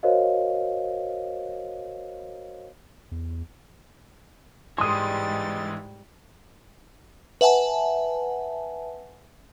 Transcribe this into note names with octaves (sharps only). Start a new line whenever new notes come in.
F#4 A#4 C5 C#5 D#5 F5
E2
G#2 E3 G3 G#3 C6 D#6 A6
B4 E5 F#5 G#5 A5